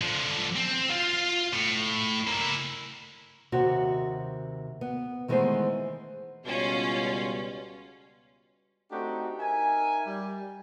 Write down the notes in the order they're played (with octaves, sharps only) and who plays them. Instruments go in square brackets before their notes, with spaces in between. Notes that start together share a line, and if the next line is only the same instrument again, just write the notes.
[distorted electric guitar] D3 F3
C4
F4 F5
A2
A#3 E4
[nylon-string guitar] D#2 C3 F#4
B3
D#3 E3 G#3 A3 B3 C5
[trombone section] C#2 B2 G3 [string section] C#4 F4
[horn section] A3 C4 D4 D#4 F#4 G4
D#4 A#4 E5 G#5
G3